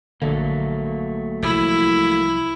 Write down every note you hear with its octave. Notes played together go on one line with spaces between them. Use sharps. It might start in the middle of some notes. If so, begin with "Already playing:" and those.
A#1 D3 F#3 A3 A#3
C2 F3 E4